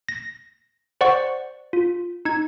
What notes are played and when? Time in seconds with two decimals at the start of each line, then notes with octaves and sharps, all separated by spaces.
0.09 A#6
1.01 C5 D5 F#5 C#6
1.73 F4
2.25 D#4 G#6